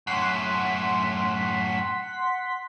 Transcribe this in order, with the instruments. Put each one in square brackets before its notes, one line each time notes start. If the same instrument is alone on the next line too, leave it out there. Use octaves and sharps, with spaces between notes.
[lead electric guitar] F#2 A2 [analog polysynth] F#5 C6 B6